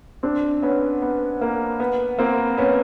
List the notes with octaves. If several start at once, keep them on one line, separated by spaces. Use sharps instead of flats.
C4 D4
B3 C#4
B3
A#3
B3
A#3 C4
B3 C#4